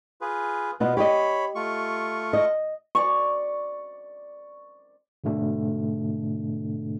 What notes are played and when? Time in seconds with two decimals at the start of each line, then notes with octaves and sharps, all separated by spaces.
0.21 F4 G#4 B4
0.80 B2 B3 F4 B4 D#5
0.97 G4 C#5 D#5 B5
1.55 A3 F4 C#6
2.33 D#5
2.95 D5 C#6
5.24 G#2 B2 D3 A3 D4